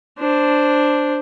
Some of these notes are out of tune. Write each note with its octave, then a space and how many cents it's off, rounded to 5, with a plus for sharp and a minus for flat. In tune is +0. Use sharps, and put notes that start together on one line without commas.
D4 +0 C5 +0